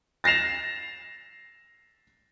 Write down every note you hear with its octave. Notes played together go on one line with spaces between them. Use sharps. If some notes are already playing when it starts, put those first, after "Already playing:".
A6 A#6 C7 E7 F7